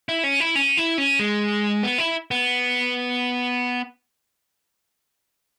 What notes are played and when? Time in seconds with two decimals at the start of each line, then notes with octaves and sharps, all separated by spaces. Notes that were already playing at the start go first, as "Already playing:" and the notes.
0.09 E4
0.23 C#4
0.40 E4
0.56 C#4
0.77 E4
0.98 C#4
1.19 G#3
1.83 B3
1.98 E4
2.31 B3